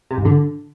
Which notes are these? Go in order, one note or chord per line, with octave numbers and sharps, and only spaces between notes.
C3
G#2
D3